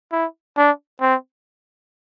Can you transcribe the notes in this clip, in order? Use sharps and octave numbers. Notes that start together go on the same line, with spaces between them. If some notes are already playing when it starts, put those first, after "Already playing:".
E4
D4
C4